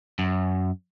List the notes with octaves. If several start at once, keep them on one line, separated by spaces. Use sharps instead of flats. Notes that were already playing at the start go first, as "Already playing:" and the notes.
F#2